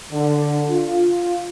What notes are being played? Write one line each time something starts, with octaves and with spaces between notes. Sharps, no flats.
D3
F4